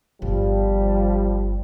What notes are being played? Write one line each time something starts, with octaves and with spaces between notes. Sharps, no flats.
G1 F3 G3